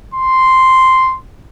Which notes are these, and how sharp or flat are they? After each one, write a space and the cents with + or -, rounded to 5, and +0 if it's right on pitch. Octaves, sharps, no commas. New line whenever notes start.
C6 -5